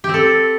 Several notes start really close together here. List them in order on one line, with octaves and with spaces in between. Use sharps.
G4 C4 A4